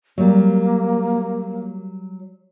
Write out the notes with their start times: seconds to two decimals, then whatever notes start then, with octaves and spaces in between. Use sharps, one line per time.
0.18 F#3 G3 A#3